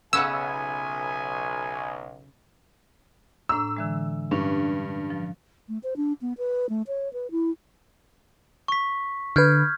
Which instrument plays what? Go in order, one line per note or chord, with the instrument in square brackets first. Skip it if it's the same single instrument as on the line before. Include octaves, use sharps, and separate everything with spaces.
[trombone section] B1 [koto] C#3 B3 C#4 [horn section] D#5 E5 G#5 [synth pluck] E6
[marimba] A2 D4 A#5 [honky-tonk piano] E6
[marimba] D3 E3 G#3
[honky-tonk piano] G2 [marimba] C#4 D4
[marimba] F3
[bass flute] A3
C5
D4
B3
B4
A3
C#5
B4
E4
[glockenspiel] C#6 B6
[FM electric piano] D3 B4 [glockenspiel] F6 G6 G#6